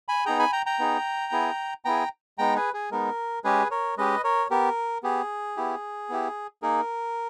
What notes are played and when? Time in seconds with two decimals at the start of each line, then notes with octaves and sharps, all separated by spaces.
0.08 G#5 B5
0.25 B3 D#4 G#4 G5 A#5
0.39 G#5 B5
0.52 G5 A#5
0.66 G5 A#5
0.79 B3 D#4 G#4
1.32 B3 E4 G#4
1.85 B3 E4 G#4 G5 A#5
2.38 G#3 B3 D#4 G5 A#5
2.56 G#4 B4
2.74 G#4
2.91 G#3 B3 D#4 A#4
3.44 G#3 C#4 G4 G#4 B4
3.71 A#4 C#5
3.97 G#3 C#4 G4 B4 D#5
4.24 A#4 C#5
4.50 B3 G4 A#4
5.03 B3 G4 G#4
5.57 B3 E4 G4
6.09 B3 E4 G4
6.62 A#3 D#4 G#4 A#4